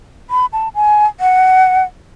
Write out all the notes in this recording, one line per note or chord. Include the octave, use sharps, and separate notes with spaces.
B5
A5
G#5
F#5